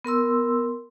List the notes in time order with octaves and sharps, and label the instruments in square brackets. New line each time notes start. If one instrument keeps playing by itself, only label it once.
[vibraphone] B3 A#4 C6 E6